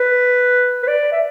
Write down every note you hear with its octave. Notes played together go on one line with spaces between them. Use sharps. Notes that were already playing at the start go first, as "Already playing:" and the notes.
Already playing: B4
B4
D5
E5